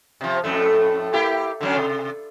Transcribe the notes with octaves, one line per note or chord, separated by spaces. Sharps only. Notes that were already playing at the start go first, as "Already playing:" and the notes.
C3 F3
F2 A2 A3
A#3 E4 G4
D3 F#3 C#4
C3